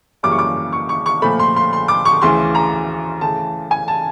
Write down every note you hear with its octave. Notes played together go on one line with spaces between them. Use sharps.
F#2 C#3 E3 G3 A#3 D6
C#6
D6
C#6
C#6
C#6
A#2 F3 A3 B5
C6
C6
C6
D6
C#6
D2 C#3 E3 C6
A#5
C#3 E3 A3 A5
G#5
A5